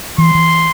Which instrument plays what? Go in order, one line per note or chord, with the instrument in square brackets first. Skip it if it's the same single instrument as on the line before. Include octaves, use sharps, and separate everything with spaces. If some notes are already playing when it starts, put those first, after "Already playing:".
[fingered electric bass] E3 [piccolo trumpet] C6
[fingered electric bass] E3